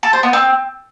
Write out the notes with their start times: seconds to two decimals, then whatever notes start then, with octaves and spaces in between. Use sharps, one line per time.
0.03 A4
0.13 C5
0.23 B3
0.33 C4